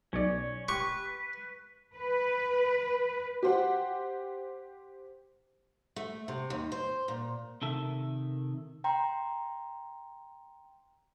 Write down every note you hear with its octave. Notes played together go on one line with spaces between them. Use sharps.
B1 C#4 C#5 D5
G4 B4 C#6
B4
G4 C5 F#5
A3
C3
D#2
C5
A#2
C3 D#3 A4 E5
G5 A#5 C6